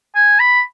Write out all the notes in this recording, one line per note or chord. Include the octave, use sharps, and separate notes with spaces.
G#5
B5